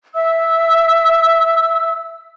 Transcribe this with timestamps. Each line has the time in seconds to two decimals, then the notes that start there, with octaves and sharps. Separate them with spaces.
0.15 E5 E6